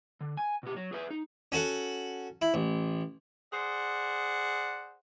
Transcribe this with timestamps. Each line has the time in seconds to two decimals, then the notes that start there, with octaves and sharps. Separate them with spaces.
0.21 D3
0.37 G#5
0.63 B2 G4
0.76 F#3
0.93 G#4 B4 E5
1.10 D#4
1.52 C#4 F#4 A4 F#5
2.42 E4
2.54 A1
3.52 G#4 C5 D5 F#5